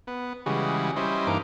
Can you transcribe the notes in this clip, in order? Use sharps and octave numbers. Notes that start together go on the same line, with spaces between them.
B3
C#3 E3 G3 G#3 F#4
G3 C#4 E4 C5 D#5
G2 E3 A#3 D#4 D6